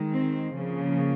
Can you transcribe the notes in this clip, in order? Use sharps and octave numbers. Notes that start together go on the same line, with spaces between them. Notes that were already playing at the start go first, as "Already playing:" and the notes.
Already playing: D#3 G#3
C4
C#3 F3 A#3